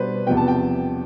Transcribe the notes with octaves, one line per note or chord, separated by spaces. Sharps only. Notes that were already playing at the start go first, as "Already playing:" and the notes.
Already playing: B2 G3 D4 B4 C5
E2 C3 F3 B3 G5
A5
G5